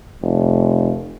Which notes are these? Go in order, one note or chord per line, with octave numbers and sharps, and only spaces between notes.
F1